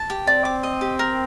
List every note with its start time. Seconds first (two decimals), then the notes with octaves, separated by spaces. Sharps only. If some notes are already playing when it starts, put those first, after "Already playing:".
Already playing: A5
0.10 G4
0.27 C4 D5
0.45 D6
0.63 D#5
0.81 G4
0.99 A#4